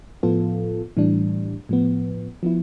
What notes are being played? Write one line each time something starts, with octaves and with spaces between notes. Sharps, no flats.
A2 F3 B3 F4 A4
A2 E3 G3 D4
A2 F3 B3
F3 B3 E4